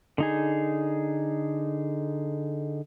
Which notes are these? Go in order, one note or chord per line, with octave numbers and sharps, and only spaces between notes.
D3 D#4 G#4